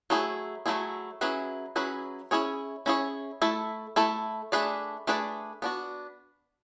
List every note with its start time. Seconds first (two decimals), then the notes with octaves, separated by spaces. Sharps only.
0.10 F#3 A3 E4 G#4
0.66 F#3 A3 E4 G#4
1.21 F#3 C#4 E4 G#4 B4
1.76 F#3 C#4 E4 G#4 B4
2.31 C#4 E4 G#4 C#5
2.86 C#4 E4 G#4 C#5
3.42 A3 E4 A4
3.96 A3 E4 A4
4.52 A3 D4 G#4 B4 D5
5.07 A3 D4 G#4 B4 D5
5.62 B3 D4 F#4